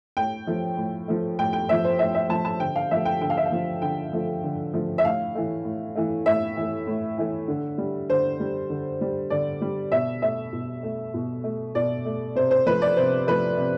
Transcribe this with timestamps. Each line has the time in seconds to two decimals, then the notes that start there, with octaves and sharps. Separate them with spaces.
0.17 A2 G5
0.47 F3 A3
0.77 A2
1.08 F3 A3
1.39 A2 G5
1.53 G5
1.68 F3 A3 E5
1.84 C5
1.99 A2 E5
2.15 E5
2.29 F3 A3 A5
2.45 A5
2.60 D3 G5
2.76 F5
2.91 F3 A3 E5
3.05 G5
3.21 D3 G5
3.30 F5
3.37 E5
3.46 F5
3.52 F3 A3
3.82 D3 G5
4.13 F3 A3
4.43 D3
4.73 F3 A3
4.98 E5
5.04 A2 F5
5.35 E3 A3
5.65 A2
5.96 E3 A3
6.26 A2 E5
6.56 E3 A3
6.87 A2
7.18 E3 A3
7.48 D3
7.78 G3
8.10 D3 C5
8.40 G3
8.70 D3
9.01 G3
9.30 D3 D5
9.62 G3
9.92 B2 E5
10.22 A3 E5
10.53 B2
10.83 A3
11.14 B2
11.44 A3
11.75 B2 D5
12.05 A3
12.35 C3 C5
12.51 C5
12.66 F3 A3 B4
12.82 D5
12.97 C3 C5
13.27 F3 A3 B4
13.58 C3